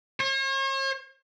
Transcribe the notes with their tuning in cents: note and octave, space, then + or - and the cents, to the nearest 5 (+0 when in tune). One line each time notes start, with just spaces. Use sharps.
C#5 -45